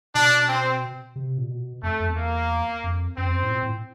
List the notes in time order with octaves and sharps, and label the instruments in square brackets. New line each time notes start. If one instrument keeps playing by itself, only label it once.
[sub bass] B2 [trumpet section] D4
[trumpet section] C4
[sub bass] C3
A#2
B2
[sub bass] F2 [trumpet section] A3
[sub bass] F2
E2
[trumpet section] A#3
[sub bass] F2
[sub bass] F#2 [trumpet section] C4
[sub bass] F2
F#2
A2
A#2
A2